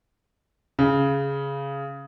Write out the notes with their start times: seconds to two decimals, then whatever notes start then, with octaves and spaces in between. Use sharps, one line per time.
0.79 C#3